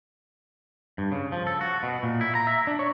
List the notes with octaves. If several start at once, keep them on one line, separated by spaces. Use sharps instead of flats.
G2
C#3
F3
A4
F#4
B2
A#2
E4
A#5
E5
D4
C#5